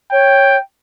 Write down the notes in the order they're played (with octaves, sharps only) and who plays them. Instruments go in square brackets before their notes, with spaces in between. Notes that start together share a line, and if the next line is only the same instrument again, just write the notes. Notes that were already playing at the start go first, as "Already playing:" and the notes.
[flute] C#5 [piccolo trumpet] G5